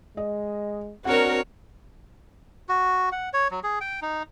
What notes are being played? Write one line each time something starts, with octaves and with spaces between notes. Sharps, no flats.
G#3 D#5
C4 D4 F#4 A#4 C#5 F#5
F#4
F#5
C#5
F#3
G#4
G5
D#4